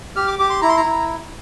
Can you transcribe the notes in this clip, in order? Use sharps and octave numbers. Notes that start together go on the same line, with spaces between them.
G4 F6
D6
G4 D6
C6
E4 A#5
C6
A#5
E4